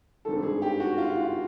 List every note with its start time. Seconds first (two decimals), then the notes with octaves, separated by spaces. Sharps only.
0.25 G#1 G2 D#3 A4
0.43 G#4
0.62 G4
0.80 F#4
0.98 F4
1.16 F4